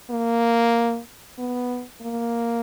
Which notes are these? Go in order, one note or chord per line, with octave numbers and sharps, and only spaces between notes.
A#3
B3
A#3